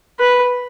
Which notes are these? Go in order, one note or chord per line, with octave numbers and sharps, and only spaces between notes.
B4